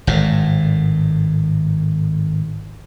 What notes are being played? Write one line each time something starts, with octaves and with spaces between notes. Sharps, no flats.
G#1 A2